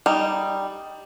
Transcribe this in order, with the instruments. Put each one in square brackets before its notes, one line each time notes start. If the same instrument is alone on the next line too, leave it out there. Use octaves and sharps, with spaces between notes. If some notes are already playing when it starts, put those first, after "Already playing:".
[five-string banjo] G3 D#4